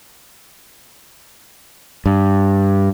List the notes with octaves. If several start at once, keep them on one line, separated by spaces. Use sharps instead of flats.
G2